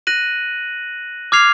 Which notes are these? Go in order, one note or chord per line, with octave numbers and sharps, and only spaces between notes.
F#6 A#6 D#7 F#7
D6 F6 G#6 C7 F7